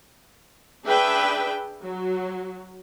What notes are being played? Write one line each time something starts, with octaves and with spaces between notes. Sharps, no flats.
D4 G#4 B4 E5 G5
F#3